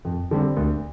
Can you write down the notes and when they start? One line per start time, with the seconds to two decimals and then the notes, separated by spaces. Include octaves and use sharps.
0.05 F2
0.31 D3 G3 C4
0.57 D2